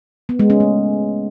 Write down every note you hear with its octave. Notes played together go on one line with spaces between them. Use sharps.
B3
G#3
C#4
A3